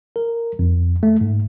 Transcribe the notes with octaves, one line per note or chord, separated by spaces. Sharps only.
A#4
F2
A3
G#2